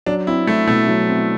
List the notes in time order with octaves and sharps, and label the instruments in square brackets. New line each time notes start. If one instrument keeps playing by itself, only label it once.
[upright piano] F#3 [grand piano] D4
[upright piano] C4 [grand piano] E4
[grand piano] A3 [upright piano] E4
[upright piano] B2 [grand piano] A3
[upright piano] F#3
C4